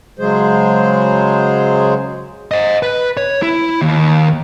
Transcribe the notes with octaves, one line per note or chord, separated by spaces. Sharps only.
C#3 F#3 G#3 G#4 C5
C5 D#5
B4
C#5
E4
D#2